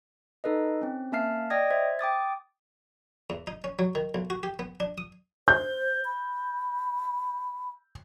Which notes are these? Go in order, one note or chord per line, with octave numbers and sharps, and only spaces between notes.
D#4 A4 B4 D#5
C4 C#4
A#3 C#4 E5 A5 F6 C7
D5 D#5 G5 D#6 G#6 A#6
C5 E5 G#6
G5 D6 D#6 A6
E2
D#4
C#4
F#3
D#3
B1
F#4
G4
B3
D4
D#6
C5 G6
B5